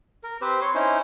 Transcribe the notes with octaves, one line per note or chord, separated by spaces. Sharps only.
A#4
C4 G4 B4 C5
C#5 C6
C#4 D#4 E4 C5